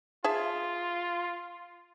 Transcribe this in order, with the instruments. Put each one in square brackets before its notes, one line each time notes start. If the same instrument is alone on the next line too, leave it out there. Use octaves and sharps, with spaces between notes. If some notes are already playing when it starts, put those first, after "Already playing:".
[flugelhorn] F4 [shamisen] G#4 E5 A5